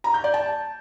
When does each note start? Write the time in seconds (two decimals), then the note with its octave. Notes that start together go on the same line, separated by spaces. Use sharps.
0.04 A#5
0.14 G6
0.24 D5
0.34 A5